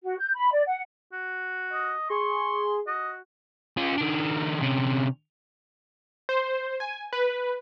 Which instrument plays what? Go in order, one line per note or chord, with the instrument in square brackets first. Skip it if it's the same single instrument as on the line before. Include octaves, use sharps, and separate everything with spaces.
[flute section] F#4
G6
B5
D5
F#5
[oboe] F#4
[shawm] D#5
[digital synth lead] G#4 [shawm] C6 [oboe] C#6
[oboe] F#4 [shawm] D#5
[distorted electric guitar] C#4 F4
D#3 D4
C3 C#4
[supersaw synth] C5
G#5
B4